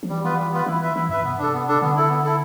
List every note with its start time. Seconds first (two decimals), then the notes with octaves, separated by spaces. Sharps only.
0.03 F3
0.09 E3 G3
0.24 B3 F4 B4
0.38 G3
0.52 B3 F4 B4
0.66 E3 E4
0.81 B4 E5
0.96 E3 E4
1.09 G2 B4 E5
1.23 C3 B3
1.38 D4 A4
1.53 B3
1.68 D4 A4
1.81 D3 B3
1.96 E4 A4
2.10 B3
2.24 E4 A4